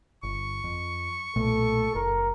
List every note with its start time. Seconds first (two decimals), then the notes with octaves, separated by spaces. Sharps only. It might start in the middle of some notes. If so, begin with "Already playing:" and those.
0.23 G1 C#6
0.64 F2
1.36 B1 A#2 A3 A4
1.95 F#1 A#4